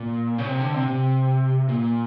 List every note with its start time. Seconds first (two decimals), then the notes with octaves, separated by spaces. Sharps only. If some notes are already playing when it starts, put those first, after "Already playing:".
Already playing: A#2
0.38 C#3
0.47 C3
0.60 D3
0.74 C3
0.87 C3
1.69 A#2